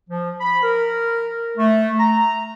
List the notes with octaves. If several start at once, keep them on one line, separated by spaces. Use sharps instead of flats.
F3
B5
A#4
A3
A#5